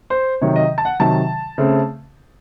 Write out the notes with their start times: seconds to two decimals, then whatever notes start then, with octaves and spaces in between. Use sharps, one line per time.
0.10 C5
0.41 C3 D#3 F#3 C#5
0.56 D#5
0.78 A5
0.85 F#5
1.00 C3 D#3 F#3 A5
1.58 C#3 A3 C4